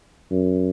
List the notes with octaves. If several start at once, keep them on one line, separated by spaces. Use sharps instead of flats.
F#2